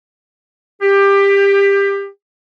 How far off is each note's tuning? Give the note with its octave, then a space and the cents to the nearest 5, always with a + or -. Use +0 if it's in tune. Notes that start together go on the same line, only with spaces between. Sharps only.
G4 +20